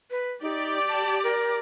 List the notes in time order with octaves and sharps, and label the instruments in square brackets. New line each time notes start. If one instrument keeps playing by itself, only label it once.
[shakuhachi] B4
[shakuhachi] D#4 [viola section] G4 D5
[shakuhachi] A5
A#4